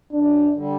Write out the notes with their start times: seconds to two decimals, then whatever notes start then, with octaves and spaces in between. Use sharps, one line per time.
0.12 F#2 D4
0.53 D3 G3